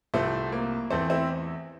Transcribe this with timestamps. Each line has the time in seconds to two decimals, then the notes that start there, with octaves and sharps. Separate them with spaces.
0.14 C2 C3 F3 A3 C4
0.52 A#3
0.91 E2 E3 A3 C4
1.10 C4 E4